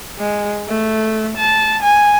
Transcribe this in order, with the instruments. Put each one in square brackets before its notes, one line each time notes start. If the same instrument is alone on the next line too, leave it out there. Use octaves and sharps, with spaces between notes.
[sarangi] G#3
A3
A5
G#5